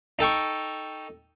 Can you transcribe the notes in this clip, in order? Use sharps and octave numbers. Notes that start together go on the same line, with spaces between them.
D#4 A4 G5 C#6